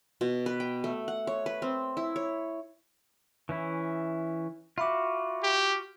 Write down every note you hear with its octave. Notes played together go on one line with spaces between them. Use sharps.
B2
B4
G5
A3
F#5
C#5
B4
C4
E4
C#5
E3 C#4 E4
F4 F#4 E5 B5 D6
G4